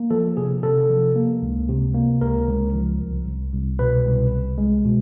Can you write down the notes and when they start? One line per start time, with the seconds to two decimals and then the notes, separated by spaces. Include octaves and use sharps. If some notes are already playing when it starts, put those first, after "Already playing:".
Already playing: A#3
0.11 F3 A4
0.37 C3 G#4
0.63 C3 A4
0.90 F3
1.15 A#3
1.42 C#2
1.68 C3
1.95 A#3
2.21 C#2 A#4
2.47 C#2
2.74 F3
3.00 C2
3.27 C2
3.53 C2
3.79 B2 B4
4.05 C2
4.32 C2
4.58 G#3
4.85 B2